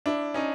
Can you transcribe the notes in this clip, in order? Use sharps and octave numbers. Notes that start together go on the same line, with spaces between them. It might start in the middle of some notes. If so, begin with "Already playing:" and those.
D4 E4
C#4 D#4